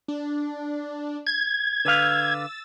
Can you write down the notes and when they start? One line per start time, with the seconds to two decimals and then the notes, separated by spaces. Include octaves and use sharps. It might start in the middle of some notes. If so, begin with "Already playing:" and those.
0.08 D4
1.27 G#6
1.85 D3 B4 F5 E6 A6